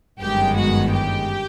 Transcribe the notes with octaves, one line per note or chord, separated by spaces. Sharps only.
G1 F#2 D#3 G#3 B3 G4 G5
F#4 F#5
G4 G5